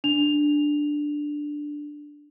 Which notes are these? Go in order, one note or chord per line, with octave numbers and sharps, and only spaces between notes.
D4 F7